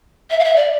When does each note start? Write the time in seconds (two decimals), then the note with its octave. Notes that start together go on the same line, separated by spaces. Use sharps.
0.31 E5
0.40 F5
0.44 E5
0.56 D5